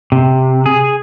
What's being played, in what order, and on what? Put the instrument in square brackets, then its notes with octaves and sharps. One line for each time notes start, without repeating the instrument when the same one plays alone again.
[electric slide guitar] C3
G#4